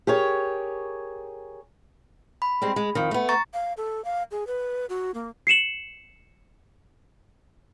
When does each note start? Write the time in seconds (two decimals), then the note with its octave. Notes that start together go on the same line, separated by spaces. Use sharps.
0.07 G4 G#4 A#4 C#5
2.42 B5
2.62 G3 G#3 C4
2.76 G#3
2.95 F2 D#3
3.11 A3 B3
3.29 A#5 C#6 A6
3.53 F5
3.77 A4
4.05 F5
4.31 G#4
4.47 B4
4.89 F#4
5.14 A#3
5.47 C7 C#7 E7 F#7